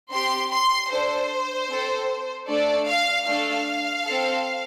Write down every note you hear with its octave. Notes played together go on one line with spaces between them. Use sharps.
C4 G4 C6
C6
D4 A4 C5
C4 A4
A3 D4 A4 D5
F5
A3 D4 A4 F5
C4 A4